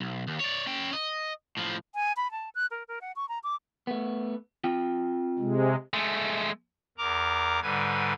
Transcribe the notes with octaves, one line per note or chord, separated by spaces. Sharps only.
B1
D#2
C#5 D5
C#4 G5
D#5
A2 F3
G#5
B5
A5
F#6
A#4
A#4
F#5
C#6
A#5
D6
A3 B3
C4 F4 G5
C3 G#3
G#3 A3
E2 A#4 A#5 D6
G#2 D3 G3 B4 G#5 G#6